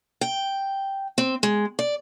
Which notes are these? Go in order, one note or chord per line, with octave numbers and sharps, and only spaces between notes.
G5
C4
G#3
D5